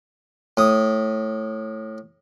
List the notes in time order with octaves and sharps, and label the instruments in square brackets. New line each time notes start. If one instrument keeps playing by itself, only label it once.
[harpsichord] A2 D#6